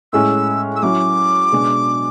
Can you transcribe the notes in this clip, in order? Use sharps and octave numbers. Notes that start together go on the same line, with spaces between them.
A2 G#3 C#4 E6
E6
F#3 C#4 E4 D6
B2 G#3 D4